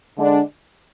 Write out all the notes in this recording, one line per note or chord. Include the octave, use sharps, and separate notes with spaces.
D3 G#3 D4